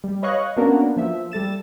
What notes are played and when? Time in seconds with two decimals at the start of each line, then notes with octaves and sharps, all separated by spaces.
0.04 G3
0.23 B4 C#5 D#5 F5 C#6 F#6
0.57 A#3 B3 C#4 D4 F#4 A#4
0.97 F3 E5
1.32 G3 A4 A6 E7